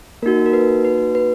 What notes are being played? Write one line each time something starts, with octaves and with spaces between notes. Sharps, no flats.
A#3 D#4 F#4 A#4
A#4
B4
B4
B4